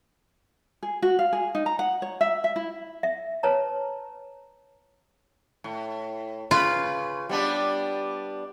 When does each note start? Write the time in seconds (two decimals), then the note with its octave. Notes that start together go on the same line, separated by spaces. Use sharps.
0.83 G#4
1.02 F#4
1.19 F5
1.33 G#4
1.55 D#4
1.66 A#5
1.79 F#5
2.02 C#5
2.21 E5
2.44 E5
2.56 E4
3.03 E5
3.43 B4 C#5 A5 A#5
5.64 A2
6.51 C#3 F4 B4
7.29 G3 B3 D4